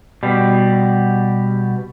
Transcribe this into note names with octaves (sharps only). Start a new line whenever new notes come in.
B2 G3